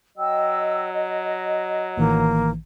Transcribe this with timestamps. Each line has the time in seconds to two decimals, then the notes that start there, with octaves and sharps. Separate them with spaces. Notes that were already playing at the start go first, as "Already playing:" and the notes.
0.18 F#3 D#5 G5 E6
0.92 D#5
1.97 A1 D#3 E3 A#3